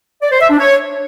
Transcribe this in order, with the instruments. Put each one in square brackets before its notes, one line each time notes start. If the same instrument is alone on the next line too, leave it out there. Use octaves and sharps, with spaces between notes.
[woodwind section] D5
C5
E5
D4
C#5